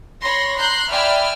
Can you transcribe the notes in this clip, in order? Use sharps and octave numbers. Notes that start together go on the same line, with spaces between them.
C#5 B5 C6 A#6
A#5 C6 F#6 G6 C7
D5 E5 G5 G#5 B5 F6